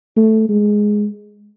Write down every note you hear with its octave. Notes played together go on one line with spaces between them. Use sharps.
A3
G#3